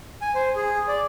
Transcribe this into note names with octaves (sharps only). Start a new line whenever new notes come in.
G#5
C5
G#4
D5